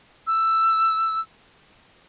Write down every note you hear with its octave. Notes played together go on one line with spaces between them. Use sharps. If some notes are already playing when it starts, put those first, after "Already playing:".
E6